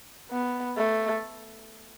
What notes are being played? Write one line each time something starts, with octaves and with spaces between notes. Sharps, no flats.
B3
A3